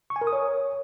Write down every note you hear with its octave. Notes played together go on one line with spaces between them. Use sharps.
C#6
G#5
A#4
D#6
C#5